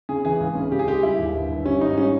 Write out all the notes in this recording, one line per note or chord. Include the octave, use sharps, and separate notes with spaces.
C#3 G#4
E3 G#4
C#2
C#3
C#2 G4
G#4
G#3 G4
G3 E4
D#2
G1
G1
G3 C#4
G#1 D#4
G3 C#4